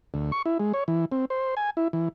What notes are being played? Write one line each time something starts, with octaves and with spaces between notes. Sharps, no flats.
D2
C#6
E4
G#3
C#5
E3
C4
C5
G#5
E4
E3